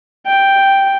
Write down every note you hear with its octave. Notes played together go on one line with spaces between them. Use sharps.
G5